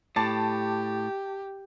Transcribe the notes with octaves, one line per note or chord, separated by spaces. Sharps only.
A2 G4 A5 D6 A6